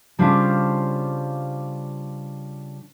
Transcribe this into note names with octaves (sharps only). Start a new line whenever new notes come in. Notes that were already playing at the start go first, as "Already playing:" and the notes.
C#3 G3 D4 F4 C5 F5